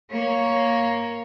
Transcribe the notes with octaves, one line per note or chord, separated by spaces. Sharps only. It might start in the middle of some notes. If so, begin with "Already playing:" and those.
A#3 C#5